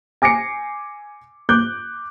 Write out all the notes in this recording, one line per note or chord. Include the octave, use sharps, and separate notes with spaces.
G#5 D6 A#6 C7 C#7
D6 F#6 G6